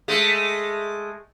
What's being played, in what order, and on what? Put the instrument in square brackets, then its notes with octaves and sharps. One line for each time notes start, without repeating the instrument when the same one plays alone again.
[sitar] G#3 A3